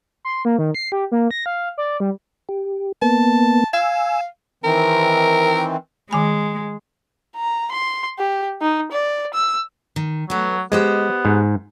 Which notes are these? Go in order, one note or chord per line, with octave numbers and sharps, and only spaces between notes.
C6
A#3
D#3
C7
G4
A#3
A#6
F5
D5
G3
G4
A#3 B3 A5
F5 G#5 E6
D#3 E3 C4 A#4
D#3 G#3 G#5 B5
A#5
C6
G4
D#4
D5
E6
D#3
F#3 A3 B3
G#3 B3 G4 C5 D#5
G#2